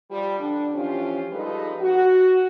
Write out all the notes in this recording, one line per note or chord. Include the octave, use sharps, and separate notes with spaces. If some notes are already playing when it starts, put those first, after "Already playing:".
F3 G3
D3 D4
E3 F3 C#4 F4 G4 C5
F3 G3 G#3 D#4 A4 B4
F#4